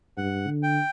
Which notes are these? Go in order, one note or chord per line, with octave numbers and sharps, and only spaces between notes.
G2 F#5
D3
G5